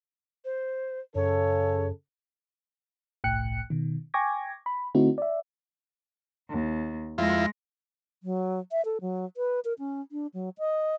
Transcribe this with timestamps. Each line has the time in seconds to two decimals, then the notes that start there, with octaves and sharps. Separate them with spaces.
0.45 C5
1.15 F#2 C#3 A4 C#5
3.24 G1 C2 A2 G5 F#6 C#7
3.70 B2 D#3
4.14 G5 G#5 C#6 D6 G#6 A#6
4.66 B5
4.95 D3 A3 C4 D#4 E4 F#4
5.18 D5 E5
6.48 D#2
7.18 F2 G#3 E4 F4 A#6
8.23 F#3
8.71 E5
8.85 A4
9.01 F#3
9.37 B4
9.65 A#4
9.79 C#4
10.12 D4
10.34 F#3
10.58 D#5